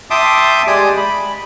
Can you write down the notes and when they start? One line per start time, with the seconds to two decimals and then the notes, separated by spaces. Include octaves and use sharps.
0.11 E5 G5 A5 C6 D6 D#6
0.67 G#3 G4 D5 G#5 D6 D#6
0.97 B5